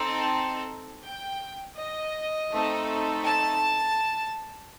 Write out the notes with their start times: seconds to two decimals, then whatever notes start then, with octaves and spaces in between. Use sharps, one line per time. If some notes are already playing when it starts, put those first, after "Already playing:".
Already playing: C4 D#4 A4 A5
1.04 G5
1.77 D#5
2.51 A3 C4 D#4 A4
3.25 A5